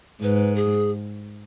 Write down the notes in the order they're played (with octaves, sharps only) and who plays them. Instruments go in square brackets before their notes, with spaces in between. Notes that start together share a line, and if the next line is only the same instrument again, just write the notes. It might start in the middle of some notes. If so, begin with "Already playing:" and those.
[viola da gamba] G#2 [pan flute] B4
[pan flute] G#4